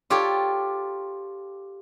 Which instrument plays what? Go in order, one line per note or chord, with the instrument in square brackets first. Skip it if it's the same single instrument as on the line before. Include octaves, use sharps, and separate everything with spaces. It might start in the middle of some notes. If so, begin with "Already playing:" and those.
[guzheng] F4 G4 A4 C#5